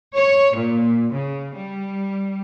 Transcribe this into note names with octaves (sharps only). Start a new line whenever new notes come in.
C#5
A#2
C#3
G3